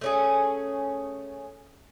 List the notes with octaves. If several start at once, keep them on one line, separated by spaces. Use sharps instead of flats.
A3 C#4 G#4